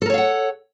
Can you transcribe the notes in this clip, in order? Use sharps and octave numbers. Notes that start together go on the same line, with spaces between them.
A4 A#4 C#5 F5 F#5